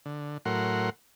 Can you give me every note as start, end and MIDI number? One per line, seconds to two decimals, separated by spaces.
0.06 0.38 50
0.45 0.90 45
0.45 0.90 54
0.45 0.90 70
0.45 0.90 78
0.45 0.90 84